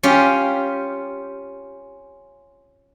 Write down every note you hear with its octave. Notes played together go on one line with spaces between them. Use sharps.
C#4 F4 G4